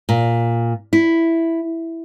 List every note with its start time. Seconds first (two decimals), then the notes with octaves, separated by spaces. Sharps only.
0.09 A#2
0.93 E4